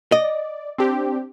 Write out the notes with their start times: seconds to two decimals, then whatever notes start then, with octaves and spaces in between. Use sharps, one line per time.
0.12 D5 D#5
0.78 C4 D4 G4